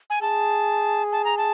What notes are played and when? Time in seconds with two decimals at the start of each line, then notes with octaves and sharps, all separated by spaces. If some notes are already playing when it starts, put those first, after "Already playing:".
0.10 G#5
0.22 G#4 A5
1.12 A5
1.25 A#5
1.37 A5